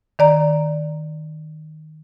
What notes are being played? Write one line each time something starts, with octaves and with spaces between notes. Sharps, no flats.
D#3 D5 A#5